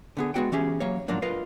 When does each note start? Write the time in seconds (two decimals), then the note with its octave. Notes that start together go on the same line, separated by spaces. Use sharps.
0.17 D3 B3 G#4
0.34 G#3 A#3 B3 F#4 F#5 G5
0.52 E3 C#4 G4 G#4
0.80 F#3 A#3 C#5
1.08 G#2 F3 F#3 A#3 D4
1.22 F4 A#4 B4 D#5 F5